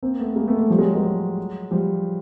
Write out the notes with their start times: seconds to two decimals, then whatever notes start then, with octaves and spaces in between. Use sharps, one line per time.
0.03 A#3 C4
0.19 A3 B3
0.36 G#3 A#3
0.48 A3 B3
0.59 A3 B3
0.70 F3 G3
0.79 F#3 G#3
0.95 F#3 G#3
1.71 F3 G3